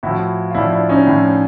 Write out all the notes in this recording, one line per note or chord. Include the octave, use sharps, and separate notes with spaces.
A2 F3 E4 F#4
F4
A2 F3 D4 E4
D4 E4
C#4 D#4
A2 F3